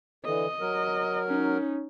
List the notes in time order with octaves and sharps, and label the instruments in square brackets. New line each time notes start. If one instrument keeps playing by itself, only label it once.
[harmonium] D3 E3 [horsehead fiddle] D#5
[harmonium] F#3 A#4
[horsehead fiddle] C#4 D#4